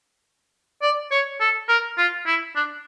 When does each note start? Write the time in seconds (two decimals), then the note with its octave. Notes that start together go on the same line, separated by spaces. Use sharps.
0.82 D5
1.11 C#5
1.40 A4
1.68 A#4
1.98 F4
2.26 E4
2.56 D4